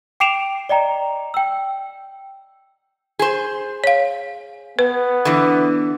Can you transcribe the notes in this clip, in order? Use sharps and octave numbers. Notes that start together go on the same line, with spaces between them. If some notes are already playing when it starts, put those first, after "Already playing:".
G5 D6 C7 D7 E7 F7
D5 D#5 G5 A#5
G5 E6
G#4 C5
C#5 F5
B3 B4
D3 E3